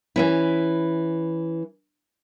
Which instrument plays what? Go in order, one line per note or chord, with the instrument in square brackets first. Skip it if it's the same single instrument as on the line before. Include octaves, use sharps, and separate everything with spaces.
[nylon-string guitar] E3 C#4 E4